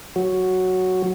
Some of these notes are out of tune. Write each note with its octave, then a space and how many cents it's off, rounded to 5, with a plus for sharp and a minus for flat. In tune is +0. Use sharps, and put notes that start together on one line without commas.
F#3 +0 F#4 +0